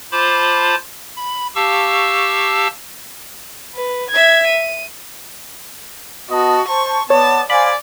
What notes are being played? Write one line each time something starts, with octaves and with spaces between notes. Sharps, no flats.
F4 C5 A5 B5 D6
B5
G4 F5 A5 C#6 E6
B4
E5 G#6
D#7
B3 F#4 D#5 A5
C5 A5 C#6
B3 C#5 D5 A5
C5 D5 F5 G#5 B5